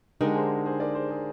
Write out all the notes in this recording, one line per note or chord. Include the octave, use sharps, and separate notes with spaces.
D3 G#3 D#4 G4 A#4
G#4 C5
G#4 C5
A#4 D5
G#4 C5
G#4 C5